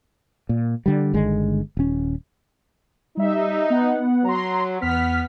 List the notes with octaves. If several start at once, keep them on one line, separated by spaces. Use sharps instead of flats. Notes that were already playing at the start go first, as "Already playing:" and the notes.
A#2
D3 G3
G1 D3 D#3 G#3
D#1 C#4
G3 D#4 E5
B3 F#5
F#3 A#5 C6
E2 B3 F6 B6